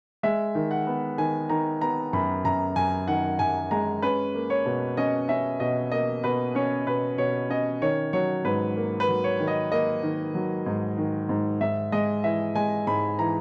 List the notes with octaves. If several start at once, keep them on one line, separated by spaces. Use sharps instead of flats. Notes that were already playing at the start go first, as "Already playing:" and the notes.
G#3 E5
D#3
F#5
B3
D#3 G#5
D#3 A#5
B3 A#5
F#2 B5
F#2 A#5
F#2 G#5
D#3 F#5
F#2 G#5
G#3 A#5
C#4 B4
A#3
C#5
B2
C#4 D#5
C#4 E5
B2 D#5
A#3 D#5
B2 B4
C#4 C#5
B2 B4
B2 C#5
C#4 D#5
D#3 C#5
F#3 C#5
G#2 B4
A#3
B4
F#3
C#5
D#3
D#5
A#3 D#5
D#3
F#3
G#2
D#3
G#2
G#2 E5
G#3 D#5
E3 E5
G#3 G#5
G#2 B5
E3 A#5